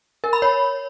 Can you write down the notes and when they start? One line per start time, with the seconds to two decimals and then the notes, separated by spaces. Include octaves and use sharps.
0.24 A#4
0.33 B5
0.42 C#5